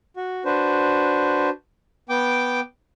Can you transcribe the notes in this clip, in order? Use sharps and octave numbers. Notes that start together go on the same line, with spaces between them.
F#4
D4 F#4 B4 C5
B3 G5 D6